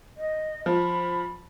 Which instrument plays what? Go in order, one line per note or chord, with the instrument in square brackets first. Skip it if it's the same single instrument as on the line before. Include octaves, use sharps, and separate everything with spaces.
[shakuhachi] D#5
[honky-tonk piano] F3 [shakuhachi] B5